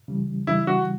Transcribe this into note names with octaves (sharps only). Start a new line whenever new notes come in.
C#3 E3 G3
C#3 E3 G3 E4
F#4